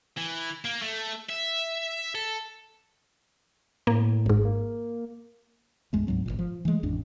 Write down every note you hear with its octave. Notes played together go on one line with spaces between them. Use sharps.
E3
A#3
A3
E5
A4
A2 A#3
G#1 G#2
A#3
B1 F#2 G#3 A3
D2 G#2 F#3 C4
G#1 D2 A#2
F3
E3 F#3 G#3 A3
A1 F2 D4